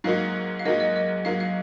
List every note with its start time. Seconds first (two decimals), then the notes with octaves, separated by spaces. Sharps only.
0.04 G#2 F#3 A#3 D#4 F#4 F5
0.59 F5
0.65 G#2 F#3 A#3 D#4 F#4 D#5
0.80 D#5
0.96 D#5
1.25 G#2 F#3 A#3 D#4 F#4 F5
1.40 F5